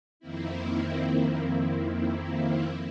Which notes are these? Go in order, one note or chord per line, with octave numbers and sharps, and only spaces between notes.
F2 D#3 A#3 C4 E4